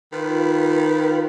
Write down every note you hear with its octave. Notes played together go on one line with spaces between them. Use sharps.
D#3 F4 B4